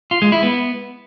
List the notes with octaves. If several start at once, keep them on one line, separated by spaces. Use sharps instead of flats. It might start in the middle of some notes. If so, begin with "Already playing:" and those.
F4
G#3
E4
B3